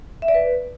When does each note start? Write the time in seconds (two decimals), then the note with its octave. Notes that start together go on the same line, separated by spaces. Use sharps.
0.22 E5
0.28 D5
0.35 B4